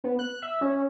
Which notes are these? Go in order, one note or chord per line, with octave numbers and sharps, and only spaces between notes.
B3
F#6
E5
C#4